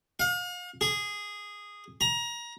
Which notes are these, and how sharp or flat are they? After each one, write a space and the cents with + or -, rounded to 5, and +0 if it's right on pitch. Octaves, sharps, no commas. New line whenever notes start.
F5 +40
G#4 -10
A#5 +25